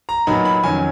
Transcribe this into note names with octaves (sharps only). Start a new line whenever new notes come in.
A#5
A#2 F#3 B3 D#4 B5
B5
F2 D#3 F#3 C#4 G#5